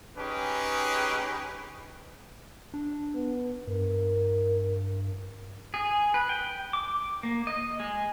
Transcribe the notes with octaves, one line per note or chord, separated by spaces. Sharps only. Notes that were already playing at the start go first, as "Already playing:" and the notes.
C#4 D#4 G4 G#4 B4
D4
B3
G2 A#4
G#4
B4
G5
D6
A#3
D#5
G#3